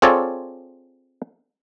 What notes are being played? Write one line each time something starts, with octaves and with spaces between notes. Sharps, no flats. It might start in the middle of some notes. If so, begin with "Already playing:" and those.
C4 F4 G#4 A4 C#5 D5